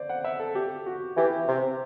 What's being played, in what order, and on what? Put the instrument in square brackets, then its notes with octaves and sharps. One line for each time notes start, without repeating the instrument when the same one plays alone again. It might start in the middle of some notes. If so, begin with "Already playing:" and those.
Already playing: [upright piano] C5 D5
F#5
E5
A4
G4
F#4
[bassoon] E3 [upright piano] G4
[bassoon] C3